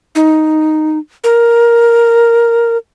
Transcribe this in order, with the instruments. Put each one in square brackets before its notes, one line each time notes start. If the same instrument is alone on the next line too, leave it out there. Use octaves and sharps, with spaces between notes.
[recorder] D#4
A#4